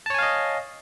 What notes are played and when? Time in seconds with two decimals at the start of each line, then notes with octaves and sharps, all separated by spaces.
0.06 A5
0.10 C#5
0.14 G#5
0.19 F5
0.23 D#5